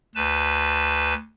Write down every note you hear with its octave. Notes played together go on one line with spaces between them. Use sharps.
D2 B4 A5